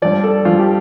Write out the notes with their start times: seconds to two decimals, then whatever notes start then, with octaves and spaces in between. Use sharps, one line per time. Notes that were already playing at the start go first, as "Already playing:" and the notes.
0.02 G2 F3 D5
0.24 A4
0.45 G2 F3 F4
0.59 G4